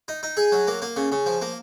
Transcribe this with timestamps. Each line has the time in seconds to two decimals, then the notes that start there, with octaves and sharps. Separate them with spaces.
0.08 D#4
0.23 D#4
0.37 G#4
0.52 F#3
0.68 A#3
0.82 A#3
0.96 C#3
1.12 C#3
1.26 F3
1.42 A#3